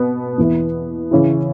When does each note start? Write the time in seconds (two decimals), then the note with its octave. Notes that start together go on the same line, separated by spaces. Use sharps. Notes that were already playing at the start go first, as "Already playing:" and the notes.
Already playing: B2 B3
0.38 E2 E3 B3 E4
1.11 C#3 E3 C#4 E4